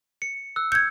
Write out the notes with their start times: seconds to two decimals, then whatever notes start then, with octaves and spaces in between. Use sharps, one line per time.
0.22 C#7
0.56 E6 F#6
0.72 G6 G#6 C#7